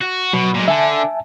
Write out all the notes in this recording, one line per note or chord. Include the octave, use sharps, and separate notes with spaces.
F#4
B2 F#3
A#2 G#3
D3 E5 G#5 A5